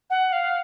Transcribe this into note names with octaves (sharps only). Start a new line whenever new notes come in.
F#5
F5